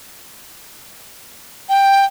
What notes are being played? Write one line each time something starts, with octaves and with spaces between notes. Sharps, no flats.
G5